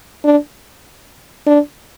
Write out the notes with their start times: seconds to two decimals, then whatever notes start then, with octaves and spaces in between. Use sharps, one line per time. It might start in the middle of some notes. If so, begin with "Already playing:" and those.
0.24 D4
1.47 D4